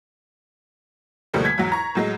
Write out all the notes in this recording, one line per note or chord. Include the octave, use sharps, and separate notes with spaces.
D2 B2 F3 G3 A3 A#3
G#6 B6
E2 G#2 F#3
A#5 C#6
A2 F#3 G#3